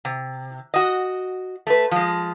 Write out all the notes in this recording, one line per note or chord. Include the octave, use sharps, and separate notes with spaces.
C3
F#4 D#5
A3 B4
F3 G#3